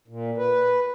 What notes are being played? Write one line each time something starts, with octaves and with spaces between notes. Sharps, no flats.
A#2
B4